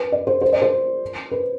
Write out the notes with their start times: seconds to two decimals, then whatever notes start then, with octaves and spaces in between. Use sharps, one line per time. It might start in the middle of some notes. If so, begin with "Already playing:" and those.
Already playing: B4
0.12 D5
0.27 C5
0.41 C5
0.53 D5
0.62 C5
1.31 B4